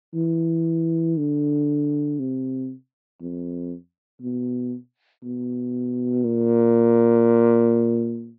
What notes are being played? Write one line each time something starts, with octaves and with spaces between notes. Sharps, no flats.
E3
D3
C3
F2
B2
B2
A#2